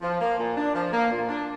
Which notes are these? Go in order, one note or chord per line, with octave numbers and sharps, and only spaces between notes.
F3
A#3
A#2
D4
F3
A#3
A#2
D4